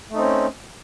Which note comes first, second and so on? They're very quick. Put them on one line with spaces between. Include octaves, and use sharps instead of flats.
A3 D#4 C4 C#4